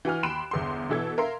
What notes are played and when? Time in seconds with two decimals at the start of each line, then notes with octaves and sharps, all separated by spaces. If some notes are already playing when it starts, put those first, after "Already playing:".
0.05 E3 F#4 G#5 F6
0.23 D#2 B5 C6 F#6 D7 E7
0.51 G1 E2 C6
0.89 B2 E3 A4 E5 G#6
1.18 A#4 E5 F5 C6